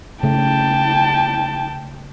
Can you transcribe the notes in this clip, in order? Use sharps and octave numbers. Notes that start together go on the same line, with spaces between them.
C#3 A3 G5 A5